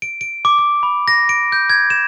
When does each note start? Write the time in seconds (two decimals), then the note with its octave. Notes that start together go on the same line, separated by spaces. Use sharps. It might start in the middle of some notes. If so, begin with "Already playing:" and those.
0.02 D7
0.21 D7
0.45 D6
0.59 D6
0.83 B5
1.08 A#6
1.29 D7
1.52 G6
1.70 G#6
1.90 E7